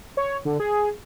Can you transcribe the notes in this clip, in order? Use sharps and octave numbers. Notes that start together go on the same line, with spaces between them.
C#5
D3
G#4